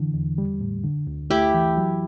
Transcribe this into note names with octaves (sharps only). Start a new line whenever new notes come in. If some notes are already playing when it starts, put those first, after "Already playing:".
Already playing: D3 E3
E2
G3
A2
D3
D2
A3 E4 G4
E3
F#3